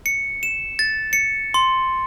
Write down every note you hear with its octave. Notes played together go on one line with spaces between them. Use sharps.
C#7
E7
A6
C#7
C6